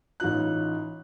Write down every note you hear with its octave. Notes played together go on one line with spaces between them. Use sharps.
A1 D#4 F4 F#6